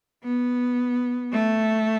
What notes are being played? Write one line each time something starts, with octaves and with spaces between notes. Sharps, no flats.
B3
A3